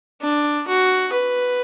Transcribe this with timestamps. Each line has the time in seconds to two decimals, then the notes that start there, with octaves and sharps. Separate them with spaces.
0.22 D4
0.67 F#4
1.12 B4